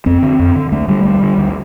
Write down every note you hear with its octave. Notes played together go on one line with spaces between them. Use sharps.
F2 C4
D3
F2
D3
D2 A3
D3 G3
D2
D3
D2